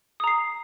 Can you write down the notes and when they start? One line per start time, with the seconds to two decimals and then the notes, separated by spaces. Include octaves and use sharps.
0.20 D#6
0.24 A#5
0.27 C7